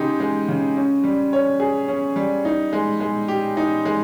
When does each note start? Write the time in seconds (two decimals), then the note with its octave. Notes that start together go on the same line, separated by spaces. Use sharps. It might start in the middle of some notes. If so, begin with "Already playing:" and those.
Already playing: C#3 G#3 D#4 G4
0.20 G#3
0.48 C#3
0.76 C#4
1.04 G3
1.33 C#5
1.60 G#4
1.88 C#4
2.16 G3
2.45 D#4
2.73 G#3
3.00 G#3
3.28 G4
3.57 D#4
3.85 G#3